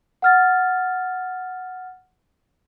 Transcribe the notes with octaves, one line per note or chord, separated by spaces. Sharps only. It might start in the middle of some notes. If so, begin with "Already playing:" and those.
F#5 F6 A6